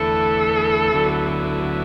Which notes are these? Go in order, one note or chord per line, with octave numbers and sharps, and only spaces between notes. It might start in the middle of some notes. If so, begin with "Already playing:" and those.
Already playing: E2 D3 A3 E4 A4 B4
D2 D3 F#3 B3 E4